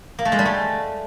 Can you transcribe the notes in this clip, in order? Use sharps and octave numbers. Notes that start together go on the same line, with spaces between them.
A#3
A3
G#3
G3
A3